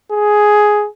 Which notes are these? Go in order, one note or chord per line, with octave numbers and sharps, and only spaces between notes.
G#4